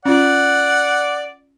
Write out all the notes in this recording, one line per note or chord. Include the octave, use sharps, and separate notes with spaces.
C#4 F4 D5 F#5